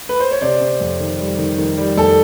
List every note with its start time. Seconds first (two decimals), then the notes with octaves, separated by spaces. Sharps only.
0.09 B4
0.20 C5
0.31 C#5
0.41 C3 C5 D5
0.60 C3
0.80 F2
1.00 D#3
1.19 G3
1.38 D#3
1.58 D#3
1.78 G3
1.97 F2 A4